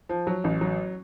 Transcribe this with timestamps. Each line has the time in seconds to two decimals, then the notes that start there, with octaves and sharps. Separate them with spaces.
0.09 F3
0.27 F#3
0.44 A1
0.61 F#3